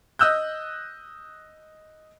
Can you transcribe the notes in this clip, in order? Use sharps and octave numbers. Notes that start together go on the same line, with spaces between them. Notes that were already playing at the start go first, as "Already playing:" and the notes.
D#5 D#6 E6 F#6 G6